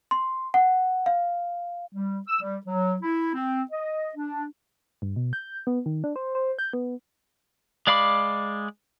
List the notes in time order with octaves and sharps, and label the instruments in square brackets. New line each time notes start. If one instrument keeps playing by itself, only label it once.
[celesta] C6
F#5
F5
[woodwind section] G3
E6
G3
F#3
E4
C4
D#5
D4
[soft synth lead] G2
B2
G6
B3
D#3
D4
C5
C5
G6
B3
[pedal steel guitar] G#3 D5 F5 B5 D6